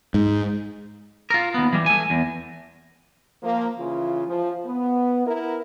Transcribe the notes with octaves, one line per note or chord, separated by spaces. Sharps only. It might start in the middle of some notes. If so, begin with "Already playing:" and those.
G#2
F4 A#4
D#2 B3
E3 G3
A3 G#5
E2
F3 A#3
C#3 E3 F4
F3
B3
B3 E4 A#4